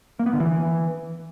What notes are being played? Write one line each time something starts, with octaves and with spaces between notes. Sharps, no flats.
A#3
B3
D3
E3